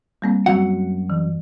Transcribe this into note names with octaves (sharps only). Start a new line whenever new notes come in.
G3 A#3 C4
F#2 F#3 G3 C4 F#4 F#5
E3